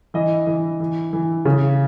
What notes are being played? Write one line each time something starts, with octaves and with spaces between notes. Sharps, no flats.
E3 D#5
E3
E3
E3
C#3